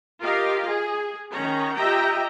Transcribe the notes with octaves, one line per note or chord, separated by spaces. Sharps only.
F4 G4 A#4 D#5 F5
G#4
D#3 C#4 C#5 A#5
F4 G4 D#5 E5 G5 A#5